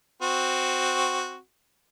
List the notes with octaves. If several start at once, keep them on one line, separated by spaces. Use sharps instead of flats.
C4 F#4